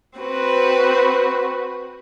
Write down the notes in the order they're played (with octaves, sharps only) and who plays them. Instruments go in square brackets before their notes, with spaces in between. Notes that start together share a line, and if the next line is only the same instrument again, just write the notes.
[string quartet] C4 F#4 B4